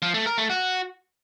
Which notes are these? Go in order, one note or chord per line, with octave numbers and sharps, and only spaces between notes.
F3
A3
A#4
A3
F#4